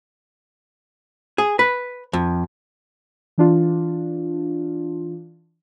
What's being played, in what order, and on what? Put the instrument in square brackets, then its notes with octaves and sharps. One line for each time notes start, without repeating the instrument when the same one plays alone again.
[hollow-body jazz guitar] G#4
B4
F2
[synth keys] E3 D4 F4